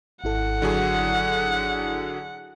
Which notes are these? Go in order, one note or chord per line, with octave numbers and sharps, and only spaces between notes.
G#1 E4 A4 F#5
D3 F#3 G#4